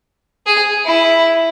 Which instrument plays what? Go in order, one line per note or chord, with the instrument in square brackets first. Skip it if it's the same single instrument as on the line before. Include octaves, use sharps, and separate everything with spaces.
[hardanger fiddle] G#4
E4